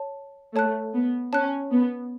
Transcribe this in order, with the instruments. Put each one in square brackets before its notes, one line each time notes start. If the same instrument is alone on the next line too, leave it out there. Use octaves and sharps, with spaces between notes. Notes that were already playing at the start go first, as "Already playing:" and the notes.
Already playing: [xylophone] C#5 A5
[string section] A3 [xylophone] C#5 A5 F#6
[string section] B3
[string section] C#4 [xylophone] C#5 A5 F#6
[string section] B3